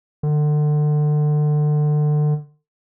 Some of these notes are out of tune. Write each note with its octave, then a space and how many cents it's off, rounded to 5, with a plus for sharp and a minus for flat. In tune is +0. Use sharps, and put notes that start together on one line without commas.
D3 +30